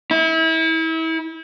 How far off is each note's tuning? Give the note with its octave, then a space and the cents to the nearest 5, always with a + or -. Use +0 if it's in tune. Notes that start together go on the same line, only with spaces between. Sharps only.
E4 -30